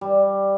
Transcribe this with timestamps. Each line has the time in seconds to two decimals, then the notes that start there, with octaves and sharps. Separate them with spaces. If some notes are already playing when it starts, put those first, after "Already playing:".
0.01 G3